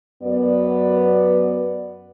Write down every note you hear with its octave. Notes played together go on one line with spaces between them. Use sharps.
F#2 B3 D5